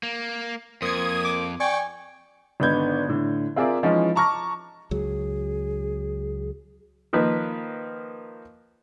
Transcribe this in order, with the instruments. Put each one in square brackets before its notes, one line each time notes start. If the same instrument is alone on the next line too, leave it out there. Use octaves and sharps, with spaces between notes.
[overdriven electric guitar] A#3
[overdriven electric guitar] F2 [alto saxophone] A#3 [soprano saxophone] C5 [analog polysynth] D#6 G#6
[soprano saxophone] D6
[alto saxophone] D5 [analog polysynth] G5 C#6 [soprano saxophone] G#5
[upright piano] G#1 D3 B3 D#4 G6 G#6
A2 D3
C4 F4 G#4 A#4 D5 E5
E3 F3 G#3 C#4 D#4 F4
A5 A#5 C#6 D6 F6 A#6
[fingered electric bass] C#2 F#3 [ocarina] G#4
[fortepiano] D#3 F3 A#3 B4